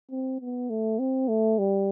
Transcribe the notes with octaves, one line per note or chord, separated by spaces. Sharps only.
C4
B3
A3
C4
A3
G3